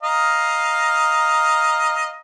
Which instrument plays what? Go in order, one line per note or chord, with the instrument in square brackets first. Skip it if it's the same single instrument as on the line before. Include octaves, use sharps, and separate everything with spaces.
[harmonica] D#5 F5 A#5